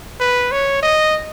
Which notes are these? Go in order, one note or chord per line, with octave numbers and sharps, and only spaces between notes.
B4
C#5
D#5